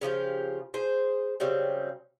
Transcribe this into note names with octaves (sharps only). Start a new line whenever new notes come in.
C#3 F3 F4 G4
G#4 C5
C#3 F#3 G3 C4